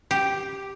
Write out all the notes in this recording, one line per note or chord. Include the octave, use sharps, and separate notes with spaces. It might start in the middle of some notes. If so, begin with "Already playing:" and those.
G4